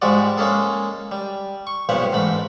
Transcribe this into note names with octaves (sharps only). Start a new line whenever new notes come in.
G#2 F3 G3 G#3 F#4 D5
G#3 A#3 C#4 G#4 A4
G3
C#6
B1 G2 A#2 F3 C#5 F#5
A1 G#2 A3 B5